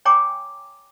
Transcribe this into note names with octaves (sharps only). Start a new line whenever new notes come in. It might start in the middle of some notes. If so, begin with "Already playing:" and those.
C#5 G5 G#5 A#5 D6